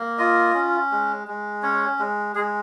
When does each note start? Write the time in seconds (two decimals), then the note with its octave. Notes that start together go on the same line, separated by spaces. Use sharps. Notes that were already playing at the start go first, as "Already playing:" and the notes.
Already playing: A#3
0.18 F4 D#5
0.54 C#4
0.91 G#3
1.27 G#3
1.63 C#4 C#5
1.99 G#3
2.35 G#3 G#4